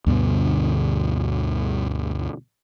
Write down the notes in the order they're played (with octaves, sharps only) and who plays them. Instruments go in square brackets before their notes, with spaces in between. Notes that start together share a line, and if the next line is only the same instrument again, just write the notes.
[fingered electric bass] D2 G2 B2 D3